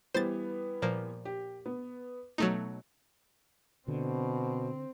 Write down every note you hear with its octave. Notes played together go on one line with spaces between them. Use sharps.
E3 G3 B3 C5 A6
A#2 F3 A#3
G4
B3
B2 F#3 A3 D#4
B2 D3 C4